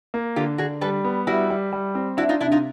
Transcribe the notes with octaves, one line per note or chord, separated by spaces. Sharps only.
A#3
D3 F4 G4
D3 F#4 G#4
G3 A4 B4
B3
G3 E4 F#4
G3
G3
C4
D4 E4 F#4
D#4 F4
C3 D4 E4
D#4 F4